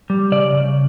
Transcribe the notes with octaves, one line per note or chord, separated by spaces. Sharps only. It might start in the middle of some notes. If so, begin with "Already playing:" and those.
G3
C#3 D5
C#3